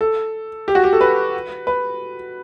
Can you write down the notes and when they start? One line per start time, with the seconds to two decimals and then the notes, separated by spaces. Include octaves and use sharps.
0.01 A4
0.68 G4
0.75 F#4
0.84 G4
0.93 A4
1.01 B4
1.67 B4